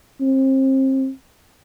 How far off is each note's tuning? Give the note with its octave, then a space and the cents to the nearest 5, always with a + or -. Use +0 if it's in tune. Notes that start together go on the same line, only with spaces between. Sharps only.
C4 +30